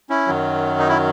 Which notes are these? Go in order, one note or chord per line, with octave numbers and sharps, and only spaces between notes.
C#4 E4
F#2 D#3 F#3
D#4
E4